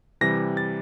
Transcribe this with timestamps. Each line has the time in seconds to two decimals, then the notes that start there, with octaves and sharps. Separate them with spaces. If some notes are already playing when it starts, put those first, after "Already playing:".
0.21 C3 E3 G3 A#6
0.57 A6